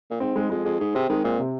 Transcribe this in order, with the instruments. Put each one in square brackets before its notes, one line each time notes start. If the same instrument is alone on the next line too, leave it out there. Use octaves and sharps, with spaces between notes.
[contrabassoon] A#2
[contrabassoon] G#2 [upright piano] C4
[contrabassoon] G#2 [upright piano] G#3
[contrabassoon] F2 [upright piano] G#3
[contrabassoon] F2 [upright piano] G#4
[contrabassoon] G#2 [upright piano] G#4
[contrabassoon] C3 [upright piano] C4
[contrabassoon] D#3 [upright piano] G#3
[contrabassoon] A#2 [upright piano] C4
[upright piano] C3